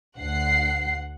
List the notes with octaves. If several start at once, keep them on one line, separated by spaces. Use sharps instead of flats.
D2 F#5 C7